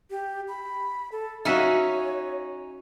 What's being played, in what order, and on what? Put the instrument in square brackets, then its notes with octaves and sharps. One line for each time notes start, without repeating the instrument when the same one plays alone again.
[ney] G4
B5
A4
[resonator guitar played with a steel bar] C#4 D#4 [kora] F#4 E5 F5 [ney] C#5